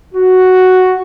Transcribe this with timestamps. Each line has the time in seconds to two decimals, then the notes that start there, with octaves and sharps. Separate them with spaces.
0.14 F#4